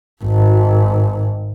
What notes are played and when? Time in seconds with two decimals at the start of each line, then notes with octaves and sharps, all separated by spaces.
0.24 G#1